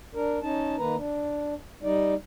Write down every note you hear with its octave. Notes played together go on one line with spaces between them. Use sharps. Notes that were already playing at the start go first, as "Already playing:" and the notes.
D4 A#4
C#4 D#4 A5
D#3 A#3 B4 A#5
D4
G3 D#4 D5